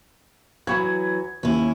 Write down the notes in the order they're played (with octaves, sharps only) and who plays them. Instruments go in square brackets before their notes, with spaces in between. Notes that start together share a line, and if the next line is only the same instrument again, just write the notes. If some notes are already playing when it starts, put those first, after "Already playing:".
[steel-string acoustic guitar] E3 F#3 [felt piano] B5 C#6 G#6
[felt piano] D#2 [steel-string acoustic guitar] C#4 E4